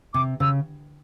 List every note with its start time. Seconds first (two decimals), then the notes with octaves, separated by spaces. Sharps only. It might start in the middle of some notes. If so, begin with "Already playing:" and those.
0.14 C3 D6
0.40 C#3 E6